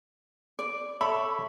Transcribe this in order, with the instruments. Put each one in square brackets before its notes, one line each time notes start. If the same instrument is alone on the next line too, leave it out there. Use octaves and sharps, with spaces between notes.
[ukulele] D5
[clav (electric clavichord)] A4 C#5 E5 [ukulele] B5